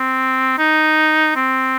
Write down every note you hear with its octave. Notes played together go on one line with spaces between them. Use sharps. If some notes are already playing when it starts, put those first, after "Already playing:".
Already playing: C4
D#4
C4